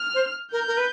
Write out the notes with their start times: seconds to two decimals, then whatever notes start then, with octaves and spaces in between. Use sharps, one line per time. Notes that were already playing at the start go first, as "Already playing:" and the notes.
Already playing: F6
0.14 C5
0.52 A#4 G6
0.67 A#4
0.77 B4